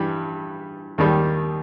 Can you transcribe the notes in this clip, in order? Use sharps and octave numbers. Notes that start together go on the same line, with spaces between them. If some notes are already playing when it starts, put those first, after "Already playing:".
Already playing: G2 E3 G3
D#2 D#3 G3